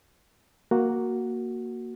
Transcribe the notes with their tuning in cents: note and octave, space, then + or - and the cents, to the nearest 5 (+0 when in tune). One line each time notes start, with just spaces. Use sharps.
A#3 +0 F#4 +0